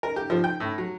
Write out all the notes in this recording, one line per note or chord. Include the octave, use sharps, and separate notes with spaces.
A#4
G4
F3
G5
A2
F#3